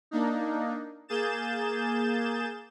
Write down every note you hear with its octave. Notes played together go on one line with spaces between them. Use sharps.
A#3 D4 D#4
A#3 G#4 G6 A6 E7